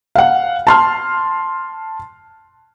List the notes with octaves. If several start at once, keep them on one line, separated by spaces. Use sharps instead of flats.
F5 F#5
A5 C6 F6